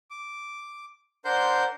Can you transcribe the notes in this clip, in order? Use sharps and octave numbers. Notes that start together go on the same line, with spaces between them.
D6
D4 A#4 C5 F#5 C6 G6